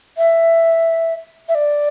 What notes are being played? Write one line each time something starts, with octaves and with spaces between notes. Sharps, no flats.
E5
E5
D5